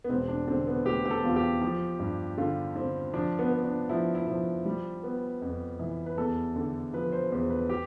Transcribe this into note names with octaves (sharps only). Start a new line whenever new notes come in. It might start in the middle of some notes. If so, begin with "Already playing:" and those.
B3
E1 C4
D4
D3 C4
B3
A3 G4
G4
A4
E2 F4
G4
F3
G2
D3 F4
D3 C4
F3 D4
B3
B3
D4
F3 E4
E4
F3
G3
B3
F2
E3
B4
E2 A4
D3
F3 B4
C5
E2 C5
B4
G4